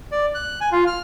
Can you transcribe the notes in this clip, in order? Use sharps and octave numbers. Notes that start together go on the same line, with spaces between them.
D5
F#6
G#5
F4
F6